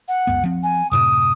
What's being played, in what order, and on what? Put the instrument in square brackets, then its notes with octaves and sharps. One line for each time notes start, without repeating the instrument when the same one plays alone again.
[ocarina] F#5
[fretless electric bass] C#2 F#2 B3
F3 C4
[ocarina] G#5
[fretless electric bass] F#2 A2 C3 [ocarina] D#6